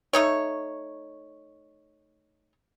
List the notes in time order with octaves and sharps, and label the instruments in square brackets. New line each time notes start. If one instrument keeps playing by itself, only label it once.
[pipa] A3 D#4 C#5